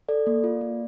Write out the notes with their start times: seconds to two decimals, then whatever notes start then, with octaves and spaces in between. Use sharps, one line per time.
0.09 A4 D5
0.27 A#3
0.44 F4
0.61 A#3